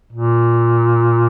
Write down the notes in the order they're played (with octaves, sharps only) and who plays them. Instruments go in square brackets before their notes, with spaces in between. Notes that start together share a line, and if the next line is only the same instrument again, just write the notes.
[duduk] A#2